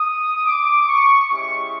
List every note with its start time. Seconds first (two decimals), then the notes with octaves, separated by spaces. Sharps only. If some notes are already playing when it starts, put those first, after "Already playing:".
Already playing: D#6
0.45 D6
0.87 C#6
1.30 G#3 C#4 E4 G4 C#6